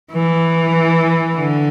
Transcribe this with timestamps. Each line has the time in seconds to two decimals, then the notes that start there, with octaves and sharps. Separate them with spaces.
0.11 E3
1.36 D3